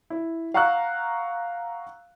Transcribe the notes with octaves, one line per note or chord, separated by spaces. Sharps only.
E4
F5 F#5 A#5 C#6 E6 F#6